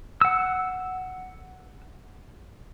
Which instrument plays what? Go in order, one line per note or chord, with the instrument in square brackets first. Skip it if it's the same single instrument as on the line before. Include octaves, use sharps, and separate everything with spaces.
[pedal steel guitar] F#5 E6